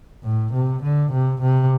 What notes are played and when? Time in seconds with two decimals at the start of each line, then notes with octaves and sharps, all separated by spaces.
0.24 A2
0.53 C3
0.83 D3
1.12 C3
1.42 C3